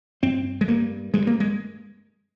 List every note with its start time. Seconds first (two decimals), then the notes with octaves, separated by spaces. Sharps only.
0.23 G2 C4
0.61 G#3
0.68 G2 A#3
1.14 G2 G#3
1.27 A#3
1.40 G#3